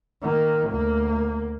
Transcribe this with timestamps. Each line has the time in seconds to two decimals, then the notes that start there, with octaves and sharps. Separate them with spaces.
0.22 D#3 A#3
0.71 D2 A#3